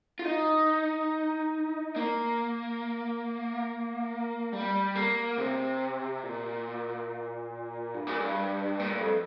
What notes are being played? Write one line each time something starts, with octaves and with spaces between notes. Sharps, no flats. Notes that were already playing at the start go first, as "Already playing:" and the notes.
F4
D#4
A#3
G3
A#3
C3
A#2
G2
A#2
G2
A#2
G2
F2